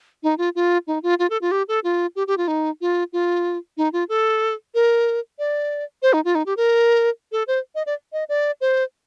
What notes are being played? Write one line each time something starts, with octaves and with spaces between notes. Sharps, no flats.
D#4
F4
F4
D#4
F4
F4
A4
F4
G4
A4
F4
G4
G4
F4
D#4
F4
F4
D#4
F4
A4
A#4
D5
C5
D#4
F4
D#4
G4
A#4
A4
C5
D#5
D5
D#5
D5
C5